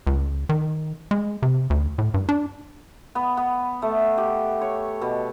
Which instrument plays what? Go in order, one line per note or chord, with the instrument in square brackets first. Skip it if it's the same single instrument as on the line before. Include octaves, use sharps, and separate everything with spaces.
[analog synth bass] C#2
D#3
G#3
C3
D2
A2
G2
D4
[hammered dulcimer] B3
B3
A3
G4
C#5
B2